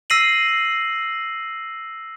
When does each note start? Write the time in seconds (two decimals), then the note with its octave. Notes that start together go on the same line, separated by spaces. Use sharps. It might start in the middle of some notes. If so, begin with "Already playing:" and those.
0.10 E6 A#6 C7 D#7 F#7